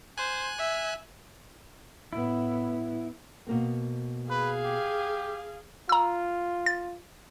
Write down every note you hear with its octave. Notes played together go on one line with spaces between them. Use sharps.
C5 G#5 F#6
E5
A2 B3 E4
B2 A#3 C4
G#4 B4 F5
G4
F4 A#5 E6
A6